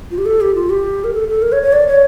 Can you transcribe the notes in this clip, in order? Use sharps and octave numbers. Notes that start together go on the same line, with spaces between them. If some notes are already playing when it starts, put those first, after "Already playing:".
F4
G4
A4
G4
F4
G4
A#4
A4
A4
A#4
C#5
C#5
D5
C#5